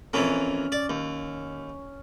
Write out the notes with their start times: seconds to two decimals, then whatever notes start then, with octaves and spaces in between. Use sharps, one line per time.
0.13 F2 E3 A#3 C#4
0.72 D5
0.90 D#2